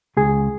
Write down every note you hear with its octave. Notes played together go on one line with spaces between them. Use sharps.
C#2 G#4